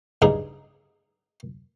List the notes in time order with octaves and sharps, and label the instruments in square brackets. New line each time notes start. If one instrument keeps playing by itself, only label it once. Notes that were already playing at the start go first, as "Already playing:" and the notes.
[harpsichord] G2 C#3 D#4 G#4